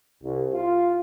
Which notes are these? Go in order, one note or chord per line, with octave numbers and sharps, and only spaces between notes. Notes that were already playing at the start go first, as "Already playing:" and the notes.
C2
F4